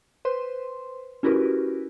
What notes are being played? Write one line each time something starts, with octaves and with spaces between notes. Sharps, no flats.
B4 C5 C6
C#4 E4 F#4 G4 A#4 B4